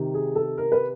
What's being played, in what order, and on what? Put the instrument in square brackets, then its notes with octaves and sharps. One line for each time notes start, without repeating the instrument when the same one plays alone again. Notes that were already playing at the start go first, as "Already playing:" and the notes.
Already playing: [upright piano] C3 D#3
G#4
A4
A#4
B4